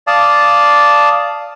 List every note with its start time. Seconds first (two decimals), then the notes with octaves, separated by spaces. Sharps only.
0.07 D5 F5 A5 D#6